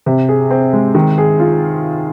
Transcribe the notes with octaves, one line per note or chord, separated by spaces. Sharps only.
C3
G#4
C4
G#3
D#3
G#4
F4